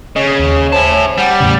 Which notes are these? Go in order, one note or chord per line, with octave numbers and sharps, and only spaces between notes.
C#3 C#5 D#5
D#2
E4 C5 G#5 A5
G3 F#5
E2 A2 C#3